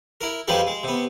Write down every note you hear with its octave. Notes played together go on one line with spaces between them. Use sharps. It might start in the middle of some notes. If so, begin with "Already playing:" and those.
E4 A#4
F2 F3 G3 G#3 D#4 B4
G#3
C3 B3